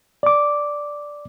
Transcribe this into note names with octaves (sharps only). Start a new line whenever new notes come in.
D5 D6